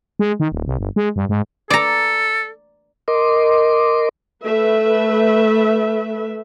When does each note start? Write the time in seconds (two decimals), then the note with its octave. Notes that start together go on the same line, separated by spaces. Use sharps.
0.19 G#3
0.40 D#3
0.52 D#1
0.66 C2
0.79 G1
0.96 G#3
1.16 G2
1.29 G#2
1.70 A4 D5 A#5
3.08 A#4 D#5 C6 D6
4.44 A3 B4 E5